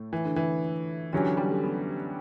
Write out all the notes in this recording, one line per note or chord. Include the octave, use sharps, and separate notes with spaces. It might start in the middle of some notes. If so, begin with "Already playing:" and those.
Already playing: A2 A3
E3
D3
E3
D3 E3 F#3 C#4 G4
G3
A3
B3